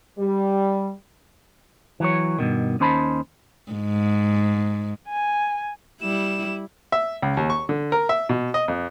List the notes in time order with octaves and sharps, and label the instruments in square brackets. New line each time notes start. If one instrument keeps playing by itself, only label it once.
[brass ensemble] G3
[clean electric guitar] E3 F#3 C#5
G2 B2 D#3
D#2 C#4 D#4 C5 A5 B5
[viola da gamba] G#2
[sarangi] G#5
[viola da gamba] G3 E4 [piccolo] E7
[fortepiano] E5
C#2
D#2
C#6
D3
A#4
E5
B2
D#5
F2